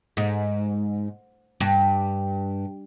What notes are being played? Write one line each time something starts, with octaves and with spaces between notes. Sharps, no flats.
G#2
G2